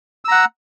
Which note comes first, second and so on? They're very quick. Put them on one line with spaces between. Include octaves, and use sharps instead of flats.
E6 A#5 F#5